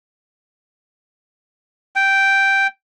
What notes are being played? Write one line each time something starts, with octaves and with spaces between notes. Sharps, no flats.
G5